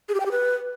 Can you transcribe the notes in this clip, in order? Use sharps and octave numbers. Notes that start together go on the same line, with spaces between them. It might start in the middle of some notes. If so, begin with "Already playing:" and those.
G#4
G4
G5
G4
B4